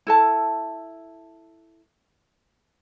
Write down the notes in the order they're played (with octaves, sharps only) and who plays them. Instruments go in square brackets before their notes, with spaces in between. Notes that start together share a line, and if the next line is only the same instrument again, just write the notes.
[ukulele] E4 A4 A5